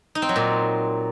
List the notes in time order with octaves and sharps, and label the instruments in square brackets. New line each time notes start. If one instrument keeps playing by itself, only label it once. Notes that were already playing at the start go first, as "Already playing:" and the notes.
[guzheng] D#4
C4
F#3
A#2